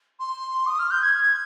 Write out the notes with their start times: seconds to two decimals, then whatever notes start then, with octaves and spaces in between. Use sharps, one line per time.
0.20 C6
0.66 D#6
0.79 F6
0.90 G6
1.01 G#6